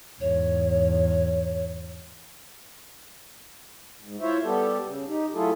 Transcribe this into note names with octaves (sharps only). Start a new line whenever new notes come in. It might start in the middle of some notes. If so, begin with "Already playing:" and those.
E2 G#2 C#5
G#2
E4 F4 C5 C#5 E5
G3 B3 G4 A4
C#3
D#4 G4
F#3 A3 E4 F4 G#4 A4